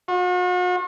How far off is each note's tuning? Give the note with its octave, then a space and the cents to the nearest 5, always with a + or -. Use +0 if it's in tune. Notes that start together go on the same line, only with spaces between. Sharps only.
F#4 -45